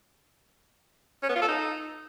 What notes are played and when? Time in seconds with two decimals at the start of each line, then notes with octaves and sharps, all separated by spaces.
1.23 C#4
1.29 B3
1.36 F4
1.42 A4
1.48 D#4